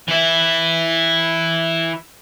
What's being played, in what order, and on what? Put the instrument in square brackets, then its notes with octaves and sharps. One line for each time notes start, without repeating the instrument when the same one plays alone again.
[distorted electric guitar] E3 E4